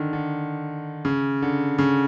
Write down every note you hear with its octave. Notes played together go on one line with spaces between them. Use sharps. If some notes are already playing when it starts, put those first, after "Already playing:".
Already playing: D3 D#3
D3
C#3
D3
C#3